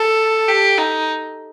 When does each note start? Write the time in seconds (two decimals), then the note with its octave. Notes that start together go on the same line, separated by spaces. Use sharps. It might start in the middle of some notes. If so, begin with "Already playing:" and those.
Already playing: A4
0.48 G4
0.78 D#4